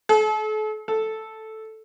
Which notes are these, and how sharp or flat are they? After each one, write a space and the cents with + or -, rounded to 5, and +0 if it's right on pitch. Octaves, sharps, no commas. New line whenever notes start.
A4 -40
A4 -5